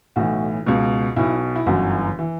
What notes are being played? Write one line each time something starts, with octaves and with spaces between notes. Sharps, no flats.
B1 A2 E3 F#4
C#2 B2
B1 B2 E4
E4
G1 F#2 E3 F#4
E3